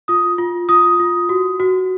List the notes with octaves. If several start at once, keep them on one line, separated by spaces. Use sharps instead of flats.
F4 D#6
F4
F4 D#6
F4
F#4
F#4